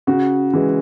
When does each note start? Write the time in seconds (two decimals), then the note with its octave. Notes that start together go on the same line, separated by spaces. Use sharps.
0.07 C#3 F#4
0.53 E3 G#3